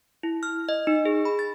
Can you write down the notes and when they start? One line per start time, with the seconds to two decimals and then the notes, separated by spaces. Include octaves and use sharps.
0.23 E4
0.43 F6
0.69 D#5
0.87 D#4
1.05 G#4
1.25 B5
1.39 A6